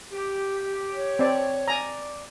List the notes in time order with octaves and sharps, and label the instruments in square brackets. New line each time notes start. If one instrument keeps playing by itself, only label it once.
[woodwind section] G4
[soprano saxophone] C#5
[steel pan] C4 D5
[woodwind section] D5 [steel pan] G#5 A#5